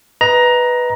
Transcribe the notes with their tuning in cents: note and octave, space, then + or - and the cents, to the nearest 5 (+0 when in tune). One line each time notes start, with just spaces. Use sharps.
B4 +0 D#5 +10 A#5 +15